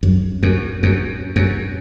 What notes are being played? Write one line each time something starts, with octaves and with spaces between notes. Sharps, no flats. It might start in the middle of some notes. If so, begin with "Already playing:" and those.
F#2
F#2
F#2
F#2